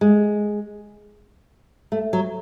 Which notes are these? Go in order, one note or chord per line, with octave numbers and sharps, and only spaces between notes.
G#3
A3
F#3